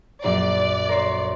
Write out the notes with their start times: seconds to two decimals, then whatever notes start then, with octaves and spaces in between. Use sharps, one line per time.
0.24 A#1 F#2 D5
0.89 A#4 C5 C#5